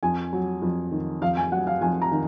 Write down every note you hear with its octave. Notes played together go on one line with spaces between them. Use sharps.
F2 G#5
F#3
F2
D#3
F2 F5
G#5
F#3 F#5
F5
F2 G#5
A#5
D#3